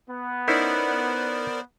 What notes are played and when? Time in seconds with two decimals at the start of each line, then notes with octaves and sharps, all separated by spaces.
0.10 B3
0.48 C#4 D#4 E4 A#4 C5 D5